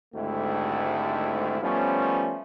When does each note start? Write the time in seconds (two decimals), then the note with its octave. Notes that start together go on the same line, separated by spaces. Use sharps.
0.13 G#1 D2 G#2 A3 E4 G4
1.62 F3 G3 A3 B3 C#4